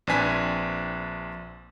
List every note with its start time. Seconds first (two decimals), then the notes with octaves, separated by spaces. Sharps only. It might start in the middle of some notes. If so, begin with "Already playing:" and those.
0.07 A#1 C4 D4 B4 G#5 B6